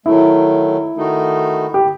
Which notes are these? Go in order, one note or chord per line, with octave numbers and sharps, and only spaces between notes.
D#3 F#3 A3 E4
D#3 A3 D#4 F#4
G4